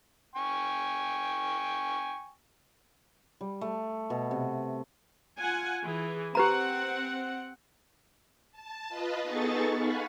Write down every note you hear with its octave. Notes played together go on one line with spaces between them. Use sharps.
G5 G#5 C#6
G3
A3
B2
C3
F4 F#5 G#5
E3 G#4
C4 G4 B4 F#5 A#5
A5
F4 B4 D#5
B3 D#4 G#4 A4 C#6 A6
F5 F#5 G#5 B5 C#6